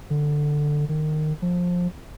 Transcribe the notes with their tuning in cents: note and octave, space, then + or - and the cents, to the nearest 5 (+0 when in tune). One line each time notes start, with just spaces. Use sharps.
D3 +10
D#3 -20
F3 +20